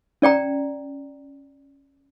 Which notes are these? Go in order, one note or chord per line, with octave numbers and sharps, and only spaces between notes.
C#4 D5 G5 A#5